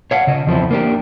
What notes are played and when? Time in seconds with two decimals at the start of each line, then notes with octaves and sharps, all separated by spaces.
0.11 C#5 F5 F#5
0.27 C#3 D#5
0.47 E2 F3 C4 E4
0.71 A#3 D4 G4